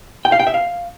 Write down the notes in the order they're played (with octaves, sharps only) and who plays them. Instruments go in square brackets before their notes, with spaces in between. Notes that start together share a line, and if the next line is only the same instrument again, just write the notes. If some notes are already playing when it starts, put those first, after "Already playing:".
[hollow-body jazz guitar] G5
F5
G5
E5
F5